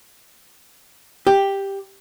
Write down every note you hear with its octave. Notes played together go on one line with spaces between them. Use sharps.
G4